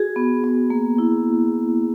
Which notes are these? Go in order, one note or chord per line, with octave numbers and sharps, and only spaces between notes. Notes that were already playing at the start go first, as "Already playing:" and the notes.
Already playing: F#4 G#4
B3
B3
A#3
E4